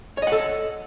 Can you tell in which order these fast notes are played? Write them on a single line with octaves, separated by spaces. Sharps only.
C#5 D#5 F#5 A4